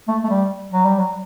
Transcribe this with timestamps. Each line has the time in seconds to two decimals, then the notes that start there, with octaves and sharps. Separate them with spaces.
0.08 A3
0.24 A3
0.30 G3
0.72 F#3
0.85 G3
0.99 F#3